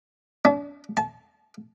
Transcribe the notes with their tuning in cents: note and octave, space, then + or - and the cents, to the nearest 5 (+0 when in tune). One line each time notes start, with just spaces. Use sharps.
D4 -40
A5 -30